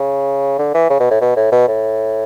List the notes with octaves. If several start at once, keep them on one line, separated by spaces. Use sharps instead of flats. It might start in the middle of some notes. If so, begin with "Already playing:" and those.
Already playing: C#3
D3
E3
C#3
B2
A2
B2
A2
B2
A2